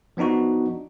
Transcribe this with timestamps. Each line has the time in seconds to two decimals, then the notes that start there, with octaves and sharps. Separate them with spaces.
0.17 F3 B3 D4 D#4 F#4